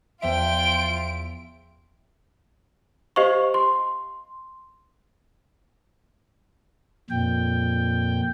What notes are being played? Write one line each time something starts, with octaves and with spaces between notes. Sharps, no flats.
E2 F3 F4 E5 G5 D7
G4 C5 D#5 F5 C#6
C6
F2 A#2 G5